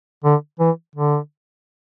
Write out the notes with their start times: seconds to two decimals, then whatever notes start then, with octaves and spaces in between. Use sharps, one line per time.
0.24 D3
0.59 E3
0.95 D3